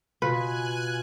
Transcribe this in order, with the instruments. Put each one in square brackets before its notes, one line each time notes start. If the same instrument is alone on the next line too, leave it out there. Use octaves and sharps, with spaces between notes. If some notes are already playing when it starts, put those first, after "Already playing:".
[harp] B2 [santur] F4 [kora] B4 [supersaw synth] G#5 F#6